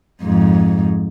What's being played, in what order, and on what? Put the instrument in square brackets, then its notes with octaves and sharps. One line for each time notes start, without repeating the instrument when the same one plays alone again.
[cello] F2 G#2